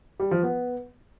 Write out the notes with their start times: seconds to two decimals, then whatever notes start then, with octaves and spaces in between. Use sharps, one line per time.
0.20 G3
0.31 F3
0.43 B3